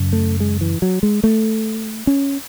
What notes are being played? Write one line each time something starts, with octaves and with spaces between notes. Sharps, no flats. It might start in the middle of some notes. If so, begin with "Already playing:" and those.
Already playing: F#2 C#3
A3
G#3
E3
F#3
G#3
A3
C#4